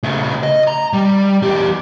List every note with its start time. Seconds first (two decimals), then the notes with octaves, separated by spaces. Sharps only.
0.03 C#3 A3
0.43 D#5
0.68 A#5
0.93 G3
1.42 E2 G4